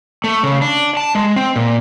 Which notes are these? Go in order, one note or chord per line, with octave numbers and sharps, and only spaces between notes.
A3
C#3
D4
A5
G#3
C4
A#2